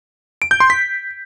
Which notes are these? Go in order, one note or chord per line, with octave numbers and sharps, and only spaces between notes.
D7
G6
C6
B6